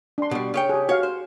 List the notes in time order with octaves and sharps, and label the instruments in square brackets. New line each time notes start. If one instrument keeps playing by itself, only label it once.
[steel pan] D4 C6
[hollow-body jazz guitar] B2 G3
C#3 C#5 G5
[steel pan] G4 G#4
[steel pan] F#4 F5 [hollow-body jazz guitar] C#5
[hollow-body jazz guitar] C5